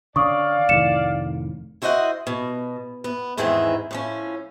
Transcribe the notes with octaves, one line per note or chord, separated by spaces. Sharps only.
D3 C#4 D5 F5 C#6 D#6
F1 A2 D#3 C#7 E7
E4 F#4 C5 D#5 E5 F#5
B2
B3
E2 G#2 D#3 E3 C4 G#4
A2 F3 C#4